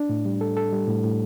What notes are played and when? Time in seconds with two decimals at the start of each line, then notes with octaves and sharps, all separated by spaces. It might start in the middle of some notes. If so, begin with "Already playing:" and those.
Already playing: D4
0.09 A2
0.26 G3
0.41 A4
0.57 A4
0.72 G3
0.88 A2
1.04 A2